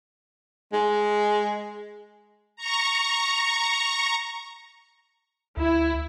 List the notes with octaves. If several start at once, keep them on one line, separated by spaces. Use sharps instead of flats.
G#3
A#5 C#6
D2 E4